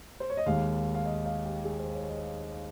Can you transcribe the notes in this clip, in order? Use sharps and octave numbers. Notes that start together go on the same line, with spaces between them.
C5
C#5
D#5
D#2 D#3 G#3 F5
F5
D#5
F5
G4
G#4
C5
C#5
D#5